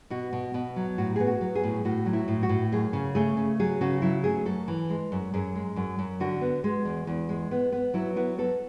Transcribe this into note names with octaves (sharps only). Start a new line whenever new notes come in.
B2 F#4
B2
B2
F#3
A2 F#4
B3 G#4
F#4
F#3
G#4
A2
A2 F#4
F#3
E4
A2
F#4
A2
F#2 G#4
C#3
A3 G#4
C#3
F#3 G#4
C#3 F#4
F#3 E4
A3 G#4
F#2 A4
E3
G#3
F#2
F#2 G#4
G#3
F#2
F#2
D3 F#4
B3
G#3
E2
E2
G#3
B3
B3
F#3 E4
B3 E4
B3 A4